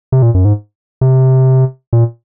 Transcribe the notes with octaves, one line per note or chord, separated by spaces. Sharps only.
C3
A#2
F#2
G#2
C3
A#2